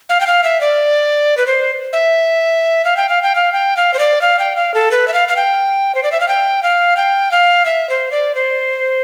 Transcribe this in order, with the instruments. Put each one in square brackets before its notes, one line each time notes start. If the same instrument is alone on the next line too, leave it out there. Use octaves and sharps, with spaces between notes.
[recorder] F5
G5
F5
E5
D5
B4
C5
E5
F5
G5
F5
G5
F5
G5
F5
C5
D5
F5
G5
F5
A4
B4
E5
F5
F5
G5
C5
D5
E5
F5
G5
F5
G5
F5
E5
C5
D5
C5